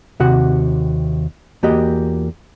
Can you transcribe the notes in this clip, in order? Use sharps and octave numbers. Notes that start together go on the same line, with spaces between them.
D#2 C3 F#4 F#5
E2 A#3 F#4 G4 D#5